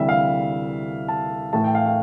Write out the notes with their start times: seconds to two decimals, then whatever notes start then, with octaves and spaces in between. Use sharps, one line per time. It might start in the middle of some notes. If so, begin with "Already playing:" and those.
Already playing: D2 C3 E3 G3 E5
0.09 F5
1.08 A5
1.53 A2 E3 A3 A5
1.64 G5
1.75 F5
1.86 F5